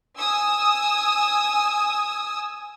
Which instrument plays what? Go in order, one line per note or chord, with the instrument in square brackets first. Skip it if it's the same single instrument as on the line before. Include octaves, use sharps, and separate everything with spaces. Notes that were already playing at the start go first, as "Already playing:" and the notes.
[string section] G#5 D#6 E6